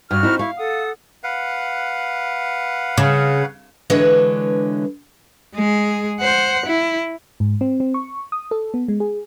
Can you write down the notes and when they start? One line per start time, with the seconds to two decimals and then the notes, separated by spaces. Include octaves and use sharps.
0.11 G2 F#4 F6
0.23 C4 D#4 E4
0.39 E4 F5 C#6
0.57 A4 F#5 D#6
1.24 B4 F5 F#5
2.98 C#3
3.90 D3 E3 G#3 D4 B4 C#5
5.55 G#3 G#4
6.20 C5 F#5
6.67 E4
7.40 G#2
7.61 C4
7.80 C4
7.94 C#6
8.32 D#6
8.51 A4
8.74 B3
8.88 G#3
9.00 G#4